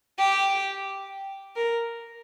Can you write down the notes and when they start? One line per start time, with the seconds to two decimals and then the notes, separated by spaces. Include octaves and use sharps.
0.19 G4
1.56 A#4